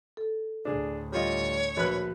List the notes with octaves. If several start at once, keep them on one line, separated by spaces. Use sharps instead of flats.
A4
D2 A2 D4 G#4
G3 F4 C#5 D#5
A#1 F#4 B4 F#6